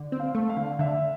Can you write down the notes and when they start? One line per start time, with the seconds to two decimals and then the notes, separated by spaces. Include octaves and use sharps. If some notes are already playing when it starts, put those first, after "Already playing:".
Already playing: D3
0.12 C4
0.20 F5
0.35 A3
0.49 F5
0.57 D3
0.79 D3 E5